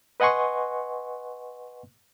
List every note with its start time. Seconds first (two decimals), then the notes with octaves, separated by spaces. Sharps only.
0.20 B4 D#5 F#5 G#5 C6 C#6